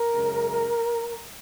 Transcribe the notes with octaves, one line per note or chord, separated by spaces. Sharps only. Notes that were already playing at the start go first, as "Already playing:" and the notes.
Already playing: A#4
F#2 C#3 G#3